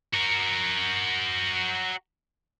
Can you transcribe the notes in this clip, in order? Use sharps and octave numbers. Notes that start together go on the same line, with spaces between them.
F#4 A#4